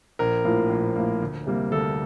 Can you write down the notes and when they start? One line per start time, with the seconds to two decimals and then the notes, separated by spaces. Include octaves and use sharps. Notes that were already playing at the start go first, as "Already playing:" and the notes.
0.19 A#1 A#4
0.45 A2 F3 A#3
0.69 A#1
0.96 A2 F3 A#3
1.21 D2
1.46 C3 G3 A#3
1.72 D2 A4